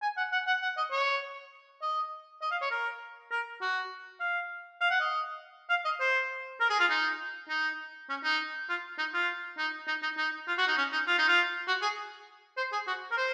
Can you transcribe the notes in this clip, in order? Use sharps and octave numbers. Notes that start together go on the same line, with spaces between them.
G#5
F#5
F#5
F#5
F#5
D#5
C#5
D#5
D#5
F5
C#5
A#4
A#4
F#4
F5
F5
F#5
D#5
F5
D#5
C5
A#4
G#4
F4
D#4
D#4
C#4
D#4
F4
D#4
F4
D#4
D#4
D#4
D#4
F4
F#4
D#4
C#4
D#4
F4
D#4
F4
F#4
G#4
C5
G#4
F#4
A#4
C5